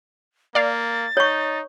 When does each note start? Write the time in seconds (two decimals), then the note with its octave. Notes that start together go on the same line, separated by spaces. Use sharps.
0.55 A#3 D5 F5 A6
1.17 D#4 C#5 C#6